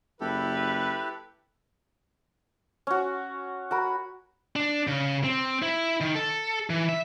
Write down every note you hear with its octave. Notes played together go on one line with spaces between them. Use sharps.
F#1 E4 G4 A4 B4
C#4 F#4
F#4 A#4 B5
D4
C#3
C4
E4
D#3
A4
E3
E5